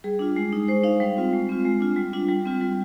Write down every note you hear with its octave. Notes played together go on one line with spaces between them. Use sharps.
G3 G#4
D4 F4
G#3
D#4
G#3 C5
D#4 F5
G3
C4 F4
G#3
C4 F4
G#3
D4 F4
G3
D4 F4
G3
C4 F4
G3